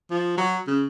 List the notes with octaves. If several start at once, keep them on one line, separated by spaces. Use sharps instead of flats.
F3
F#3
C#3